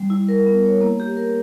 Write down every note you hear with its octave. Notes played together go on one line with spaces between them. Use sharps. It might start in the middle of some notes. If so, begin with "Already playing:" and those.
Already playing: G3
E4
A#4
B3
C#5
A#3
G4
A#4